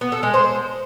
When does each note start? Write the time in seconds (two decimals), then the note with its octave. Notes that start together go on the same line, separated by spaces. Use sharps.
0.01 B3
0.12 A4
0.23 G#3
0.34 C5